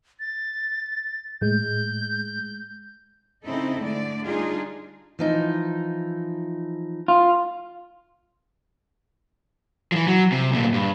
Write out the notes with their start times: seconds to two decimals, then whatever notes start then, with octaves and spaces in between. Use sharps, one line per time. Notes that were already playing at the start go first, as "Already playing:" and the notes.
0.20 A6
1.41 A2 G#3 G6
3.44 C#3 C4 D#4 E4 A4 D#5
3.78 D3 G#3 A3 D5
4.23 G3 D4 D#4 F4 G#4
5.19 E3 F3 D#4
7.08 F4
9.92 E3 F3
10.07 F#3
10.32 C3
10.51 D2 A#2
10.74 G2